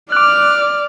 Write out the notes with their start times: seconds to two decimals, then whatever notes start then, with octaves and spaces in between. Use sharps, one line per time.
0.12 D5 D6 F6 F#6